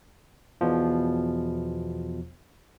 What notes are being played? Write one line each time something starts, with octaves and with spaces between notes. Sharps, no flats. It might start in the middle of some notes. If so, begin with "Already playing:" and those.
E2 B2 F3